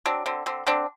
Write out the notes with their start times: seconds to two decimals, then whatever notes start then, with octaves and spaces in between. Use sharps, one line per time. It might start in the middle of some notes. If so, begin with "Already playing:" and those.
0.06 F#3 C4 D4
0.26 D3 C4
0.46 D3 C4
0.67 D3 C4 D4